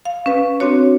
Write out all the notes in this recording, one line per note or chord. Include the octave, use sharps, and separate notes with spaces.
F5
C#4 B4
C4 D4 F#4 C#5